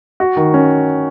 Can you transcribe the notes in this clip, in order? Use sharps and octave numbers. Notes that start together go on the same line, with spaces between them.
F#4
D#3
C#4